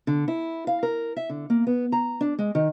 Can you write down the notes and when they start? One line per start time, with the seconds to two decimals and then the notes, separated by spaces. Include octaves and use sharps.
0.07 D3
0.28 E4
0.67 F5
0.83 A#4
1.17 E5
1.30 D3
1.50 A#3
1.67 B3
1.92 A#5
2.21 D4
2.39 G#3
2.55 D#3